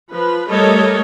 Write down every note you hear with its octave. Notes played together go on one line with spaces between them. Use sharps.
F3 B4
G3 A3 A4 A#4 C#5 D#5